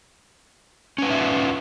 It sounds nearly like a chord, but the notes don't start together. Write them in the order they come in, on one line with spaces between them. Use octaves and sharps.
C#4 B4 D#4 E5 F4